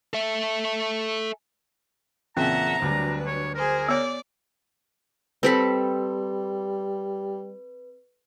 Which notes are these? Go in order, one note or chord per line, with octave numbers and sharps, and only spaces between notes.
A4 E5
E2 A#2 C#3 C4 E5 F#5 A5 A#5
D2 F#3 G3 D4 B4
C#5
G#4 A#4 C5
B3 C#5 D5
G3 C4 A4 B4 B5